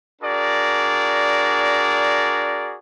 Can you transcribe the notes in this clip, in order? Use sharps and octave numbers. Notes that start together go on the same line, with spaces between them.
D4 F#4 G#4 A#4 D5